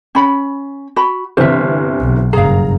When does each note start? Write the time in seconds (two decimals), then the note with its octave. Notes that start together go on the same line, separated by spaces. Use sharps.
0.15 C#4 B5
0.96 F#4 B5
1.37 G1 C3 E3 C5 E5
2.00 B1
2.33 F#1 G2 G#4 F5 A#5